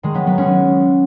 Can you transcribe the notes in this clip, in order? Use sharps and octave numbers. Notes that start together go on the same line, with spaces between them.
D#3 G#3
F#3 B3
F#3 B3
G#3 C#4